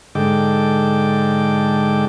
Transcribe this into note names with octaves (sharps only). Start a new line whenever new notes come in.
G#2 D3 G#3 A4 G5 D6